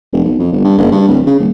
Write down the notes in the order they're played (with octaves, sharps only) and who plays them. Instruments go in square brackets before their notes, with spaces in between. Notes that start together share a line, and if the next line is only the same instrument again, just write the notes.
[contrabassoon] F1
B1
F2
G1
G2
F#1
G2
D1
C#3
D#1